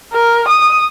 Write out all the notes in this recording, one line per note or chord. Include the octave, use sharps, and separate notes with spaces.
A#4
D#6